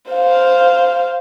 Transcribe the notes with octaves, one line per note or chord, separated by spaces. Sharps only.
C5 F5